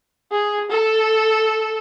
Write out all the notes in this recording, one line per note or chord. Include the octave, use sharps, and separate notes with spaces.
G#4
A4